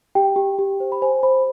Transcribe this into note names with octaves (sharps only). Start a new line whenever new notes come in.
G4 G5
G4
G4
C5
B5
C5 G#5
C5 B5